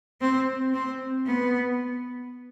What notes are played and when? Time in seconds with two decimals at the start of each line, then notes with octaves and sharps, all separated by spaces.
0.21 C4
0.73 C4
1.26 B3